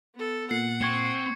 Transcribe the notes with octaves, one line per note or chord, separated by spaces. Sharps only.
B3 A4
A#2 F#5 C7
C4 C#6 G#6 C#7